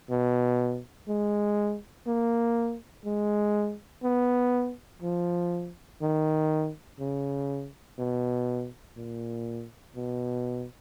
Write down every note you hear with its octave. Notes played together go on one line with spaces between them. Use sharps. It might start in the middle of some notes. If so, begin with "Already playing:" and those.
B2
G#3
A#3
G#3
B3
F3
D#3
C#3
B2
A#2
B2